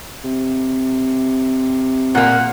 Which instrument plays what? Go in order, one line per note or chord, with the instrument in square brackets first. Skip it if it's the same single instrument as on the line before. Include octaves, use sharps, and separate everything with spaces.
[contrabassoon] C3
[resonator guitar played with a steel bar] A#2 A#3 [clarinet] F#5